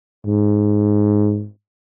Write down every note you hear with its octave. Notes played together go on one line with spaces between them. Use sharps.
G#2